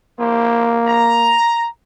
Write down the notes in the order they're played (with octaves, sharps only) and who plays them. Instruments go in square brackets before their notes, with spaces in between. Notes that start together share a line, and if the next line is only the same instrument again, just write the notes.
[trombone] A#3 [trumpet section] E4 G4 C5
[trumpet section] A#5